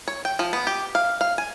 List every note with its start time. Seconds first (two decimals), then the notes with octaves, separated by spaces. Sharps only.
0.08 C#5
0.25 G5
0.39 F3
0.53 B3
0.67 G4
0.95 F5
1.21 F5
1.38 G#5